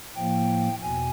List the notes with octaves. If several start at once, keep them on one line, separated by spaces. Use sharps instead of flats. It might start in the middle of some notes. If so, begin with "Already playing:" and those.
A2 F3 A#3 G5
E2 B2 G#5